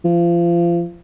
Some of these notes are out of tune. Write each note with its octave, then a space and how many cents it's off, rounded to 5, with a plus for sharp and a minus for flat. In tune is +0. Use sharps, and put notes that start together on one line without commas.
F3 -30